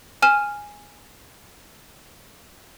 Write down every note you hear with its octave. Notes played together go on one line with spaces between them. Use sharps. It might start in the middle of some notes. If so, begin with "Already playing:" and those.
G#5 F6 E7